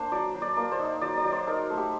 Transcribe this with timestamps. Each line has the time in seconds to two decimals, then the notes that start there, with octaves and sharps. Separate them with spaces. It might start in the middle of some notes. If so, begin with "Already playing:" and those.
Already playing: A#3 D4 C5
0.12 F#3 D5
0.35 F#3
0.42 D5
0.57 A#3 D5
0.72 C5
0.79 D#4
1.01 F#3 D5
1.17 D5
1.24 F#3
1.32 C5
1.47 D#4 A#4
1.70 A3
1.78 G4